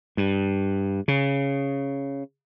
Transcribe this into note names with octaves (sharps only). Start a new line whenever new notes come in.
G2
C#3